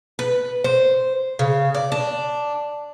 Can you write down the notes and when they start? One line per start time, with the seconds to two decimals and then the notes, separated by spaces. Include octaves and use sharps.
0.19 B4
0.64 C5
1.39 C#3
1.75 D5
1.92 D4